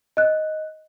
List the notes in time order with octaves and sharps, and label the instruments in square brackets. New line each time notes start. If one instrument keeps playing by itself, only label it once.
[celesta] D#5 F#6